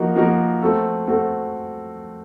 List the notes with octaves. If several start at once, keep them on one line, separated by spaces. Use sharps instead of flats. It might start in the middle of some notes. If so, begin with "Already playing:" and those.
Already playing: F3 A#3 D#4 F#4 A#4
F3 A#3 D#4 F#4 A#4
A3 C4 F#4 A4
A3 C4 F#4 A4